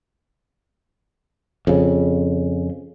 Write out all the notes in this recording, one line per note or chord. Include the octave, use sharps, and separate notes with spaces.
F2 C#3